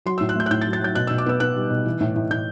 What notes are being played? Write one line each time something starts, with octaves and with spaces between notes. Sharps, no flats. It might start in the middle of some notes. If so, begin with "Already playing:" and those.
F#3 C6
A2 E6
F#6
A3 G6
F#6
A2 G6
A6
F#3
A6
F#3 G6
B2 F#6
B2 E6
D6
B3 E6
B3 F#6
G3
B2
E3
A2
A2
A2 G6